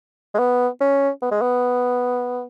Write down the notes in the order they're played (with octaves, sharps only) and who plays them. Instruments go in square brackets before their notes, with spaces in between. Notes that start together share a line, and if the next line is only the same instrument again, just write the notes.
[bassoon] G#3
B3
C#4
B3
G#3
B3